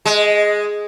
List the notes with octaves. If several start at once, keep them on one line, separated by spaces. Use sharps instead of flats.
G#3